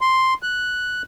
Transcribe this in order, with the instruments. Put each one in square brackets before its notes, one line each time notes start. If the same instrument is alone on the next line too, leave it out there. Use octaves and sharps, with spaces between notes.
[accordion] C6
F#6